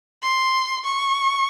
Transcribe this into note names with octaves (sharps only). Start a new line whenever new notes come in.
C6
C#6